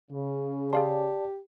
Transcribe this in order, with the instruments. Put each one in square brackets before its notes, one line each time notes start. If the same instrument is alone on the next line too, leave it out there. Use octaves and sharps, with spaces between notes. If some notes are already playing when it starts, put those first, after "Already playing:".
[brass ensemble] C#3
[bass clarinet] G4 [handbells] G#4 F5 C6 [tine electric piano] D5 A5